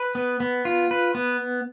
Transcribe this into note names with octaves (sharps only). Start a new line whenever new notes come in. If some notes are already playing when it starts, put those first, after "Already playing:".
Already playing: B4
B3
B3
F4
B4
B3